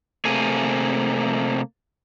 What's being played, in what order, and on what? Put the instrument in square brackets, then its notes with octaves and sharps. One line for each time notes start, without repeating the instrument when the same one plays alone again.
[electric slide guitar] C3 A3 A#3 G#4 G#5